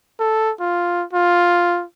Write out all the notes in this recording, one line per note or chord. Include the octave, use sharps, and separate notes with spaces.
A4
F4
F4